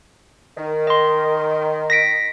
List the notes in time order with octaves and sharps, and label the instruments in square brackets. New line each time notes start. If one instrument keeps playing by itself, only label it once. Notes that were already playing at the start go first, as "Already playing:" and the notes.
[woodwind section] D#3
[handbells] D#5 C6
A#6 B6 D7